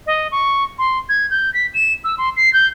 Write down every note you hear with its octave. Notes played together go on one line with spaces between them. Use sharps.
D#5
C#6
C6
G#6
G6
B6
E7
E6
C6
C7
G6